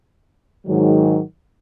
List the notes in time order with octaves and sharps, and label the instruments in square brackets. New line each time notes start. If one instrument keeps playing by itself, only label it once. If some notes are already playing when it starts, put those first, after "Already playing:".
[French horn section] G#2 D#3 F#3